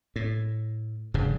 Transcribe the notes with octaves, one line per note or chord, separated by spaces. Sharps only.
A2
F1 G2 C#3